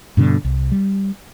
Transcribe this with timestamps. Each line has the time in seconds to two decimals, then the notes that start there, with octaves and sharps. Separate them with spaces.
0.17 G2 B2 D3
0.45 C2
0.72 G3